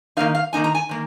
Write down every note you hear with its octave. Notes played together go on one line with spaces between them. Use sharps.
D#3 A#3 D#4 F5
F5
D#3 A#3 D#4 G#5
A#5
G#5
D#3 A#3